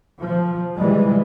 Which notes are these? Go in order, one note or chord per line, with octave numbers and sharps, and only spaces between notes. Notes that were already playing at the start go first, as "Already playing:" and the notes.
F3
E3 G3 G#3